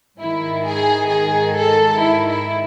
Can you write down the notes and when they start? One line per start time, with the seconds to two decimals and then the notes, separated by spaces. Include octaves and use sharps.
0.20 G#2 D#3 E4
0.65 G#4
1.09 G#4
1.53 A4
1.97 E4
2.27 E4